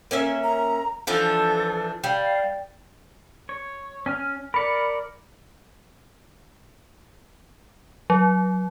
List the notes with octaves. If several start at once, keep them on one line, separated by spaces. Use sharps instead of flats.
A#3 C#4 E5
A#5
E3 F3 D4 A4
G3 F5
C#5
C#4 G#5 F6
A#4 D5 B5 C#7
F#3